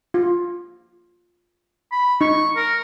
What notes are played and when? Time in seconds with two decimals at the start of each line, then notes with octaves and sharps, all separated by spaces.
0.14 F4
1.92 B5
2.21 D#4 C#6
2.56 A#4